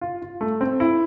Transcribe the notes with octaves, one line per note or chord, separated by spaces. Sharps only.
F4
F4
A3
C4
E4